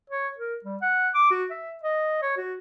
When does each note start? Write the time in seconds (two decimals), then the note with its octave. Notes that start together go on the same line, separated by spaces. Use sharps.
0.10 C#5
0.38 A#4
0.64 G3
0.82 F#5
1.14 D6
1.31 F#4
1.50 E5
1.83 D#5
2.22 C#5
2.37 F#4